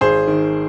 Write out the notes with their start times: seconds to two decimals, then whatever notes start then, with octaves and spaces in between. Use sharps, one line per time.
0.01 G#1 G#4 C5
0.27 D#3